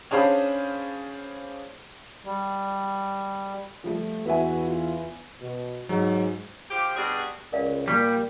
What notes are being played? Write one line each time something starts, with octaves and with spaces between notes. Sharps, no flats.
C#4 D4 G#4 C5 F5 B5
G3
F3 G3 A3
E2 F#4 B4 E5 G#5
F4
B2
G#2 F#3
F3 G4
B2 G3 D4 F#4 G#4
C#2 A#4 D5 F5
A#2 G3